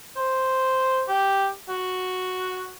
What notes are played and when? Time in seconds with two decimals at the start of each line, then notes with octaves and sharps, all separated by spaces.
0.16 C5
1.08 G4
1.69 F#4